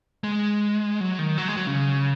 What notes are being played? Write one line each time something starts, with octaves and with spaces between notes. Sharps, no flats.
G#3
F#3
D#3
F#3
G#3
F#3
C#3